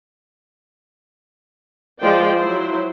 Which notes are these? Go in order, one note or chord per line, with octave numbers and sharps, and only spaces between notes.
F3 G#3 F4 C5 D5 G5
F#3 E4 C5